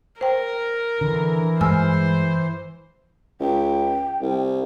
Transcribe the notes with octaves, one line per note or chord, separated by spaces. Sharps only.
A#4 C5 G5
D3 E3
G2 G#3 C5 G#5 E6 F6
C#2 G5
C2